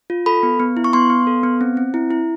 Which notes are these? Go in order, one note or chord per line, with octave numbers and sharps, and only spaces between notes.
F4
A4 B5
B3
B3
E4
C#6
B3 C6
B3
A4
B3
C4
C4
E4
E4